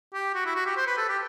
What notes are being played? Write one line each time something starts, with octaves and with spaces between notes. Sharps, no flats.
G4
F#4
E4
F#4
G4
C5
B4
A4
G4